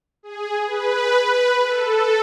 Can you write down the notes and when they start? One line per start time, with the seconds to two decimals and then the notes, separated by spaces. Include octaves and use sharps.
0.23 G#4
0.66 B4
1.24 B4
1.66 A4